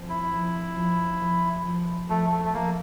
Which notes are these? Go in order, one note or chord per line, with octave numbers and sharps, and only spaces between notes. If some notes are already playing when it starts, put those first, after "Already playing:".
Already playing: F3 C4
E4
F3
F3
F3
F3
F3 A3
A3
A3
F3 A#3